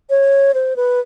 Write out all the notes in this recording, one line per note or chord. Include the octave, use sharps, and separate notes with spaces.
C#5
C5
B4